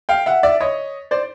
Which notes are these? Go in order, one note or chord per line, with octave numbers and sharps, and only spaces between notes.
F5 G5
E5 F#5
D5 E5
C#5 D#5
C5 D5